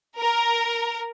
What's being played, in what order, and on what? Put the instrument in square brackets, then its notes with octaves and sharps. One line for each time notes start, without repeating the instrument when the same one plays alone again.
[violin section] A#4